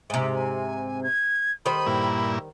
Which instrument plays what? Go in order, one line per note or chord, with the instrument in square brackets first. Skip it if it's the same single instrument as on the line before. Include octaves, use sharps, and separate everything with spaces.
[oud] G#2 C3 [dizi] E5
[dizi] G#5
G#6
[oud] D#3 G3 C5 [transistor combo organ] D#5 [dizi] B5
[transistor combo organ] G2 A#2 E4